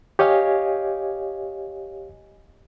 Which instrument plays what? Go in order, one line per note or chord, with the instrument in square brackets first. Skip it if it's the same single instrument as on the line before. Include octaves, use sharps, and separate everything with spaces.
[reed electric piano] G4 C#5 D#5 F5 G#5